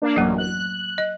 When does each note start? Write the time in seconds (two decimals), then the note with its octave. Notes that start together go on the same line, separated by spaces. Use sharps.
0.02 A#3 D4
0.16 A1 F#2 F#3 A#3
0.38 F#6
0.98 D#5